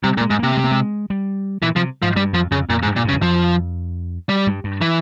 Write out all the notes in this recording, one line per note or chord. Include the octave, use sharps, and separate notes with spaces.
C3 G3
A#2
G#3
G#2
C3 A#3
G#3
A#3
G#3
G3
A#2 E3
C3 F3
G#2 F3
G2 G3
F2 F3
F2 C#3
F2 A#2
G#2
G2
A#2
G2 C#3
E2
F2 F3
G3
G2
G2
E3